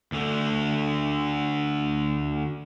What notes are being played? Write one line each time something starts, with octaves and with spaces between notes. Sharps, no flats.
D2 D3